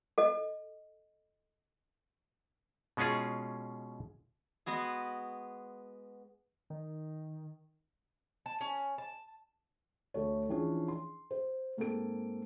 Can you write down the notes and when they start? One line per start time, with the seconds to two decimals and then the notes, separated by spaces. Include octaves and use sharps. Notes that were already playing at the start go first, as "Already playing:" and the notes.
0.18 A4 D#5
2.97 B2 G#3 C#4 F4 G#4
4.66 G#3 B3 F#4 G#4
6.70 D#3
8.46 A5
8.61 C#4
8.98 A5
10.14 D2 A3 C#5
10.49 E3 F3 C#4 D4 G#4
10.88 C6
11.31 C5
11.77 G#2 A#3 C4 G#4 A4 D7